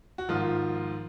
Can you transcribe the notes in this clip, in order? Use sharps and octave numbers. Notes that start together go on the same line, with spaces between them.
F#4
G#2 D#3 F3 F4